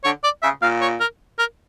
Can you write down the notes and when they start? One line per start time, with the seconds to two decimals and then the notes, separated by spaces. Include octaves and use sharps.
0.04 D3 C#5
0.24 D5
0.42 C#3 E5
0.62 A#2 F5
0.81 C#5
1.01 A#4
1.39 A#4